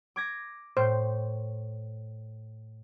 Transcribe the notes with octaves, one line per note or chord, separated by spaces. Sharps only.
D6 G#6 A#6
A2 C5